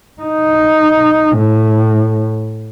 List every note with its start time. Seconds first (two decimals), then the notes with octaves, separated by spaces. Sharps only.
0.22 D#4
1.37 A2